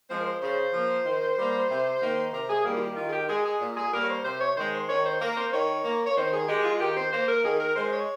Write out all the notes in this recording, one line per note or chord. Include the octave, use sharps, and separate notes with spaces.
F3 G#3 C5
A#4
C5
C#3 C5
F3 A#3
D#3
G3 A#3
C3
D#3 A#3
C3 A#4
G#4
D#3 G3 A#3 G4
F4
G4
D#3 F4
G#4
G4
G#3 G#4
G#4
A#2
G#4
G3 A#3 A#4
C#5
C5
C3 C5
C#5
D#3 G#3 C5
C5
D#3 C#5
C5
A#3 A#4
C5
D#3 C#5
A#3
C#5
D#3 C5
G#4
G#3 G4
F4
D#3 G4
C5
A#3 C5
A#4
D#3 G#4
A#4
G#3 C5
C#5